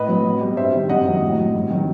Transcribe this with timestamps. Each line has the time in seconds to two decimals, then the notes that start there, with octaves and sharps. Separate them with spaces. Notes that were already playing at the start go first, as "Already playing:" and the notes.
Already playing: A2 B4 D#5
0.09 F#3
0.25 B2
0.41 G3
0.57 G2 C5 E5
0.73 D#3 G3
0.89 F#2 D#5 F#5
1.05 D#3 F#3
1.22 A2
1.39 F#3
1.55 G2
1.70 D#3 F#3